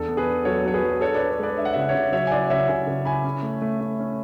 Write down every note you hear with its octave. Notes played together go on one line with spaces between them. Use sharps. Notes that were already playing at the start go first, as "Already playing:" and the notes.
Already playing: E2 D4 A4
B3
G#4 B4
D4
F#3 A4 C#5
F#3 C#5
G#4 B4
F#3
D4 A4 C#5
D4 B4 D5
A4 C#5
G#3 B4 D5
D4 E5
F#5
C#3 E5
F#5
C#5 E5
C#3
F#3 C#5 E5
G#5
E4 D5 F#5
D5
C#3 C#5 E5
C#3 E5 G#5
C#3
E4 G#5 B5
C#4
A3
A3
A3
C#4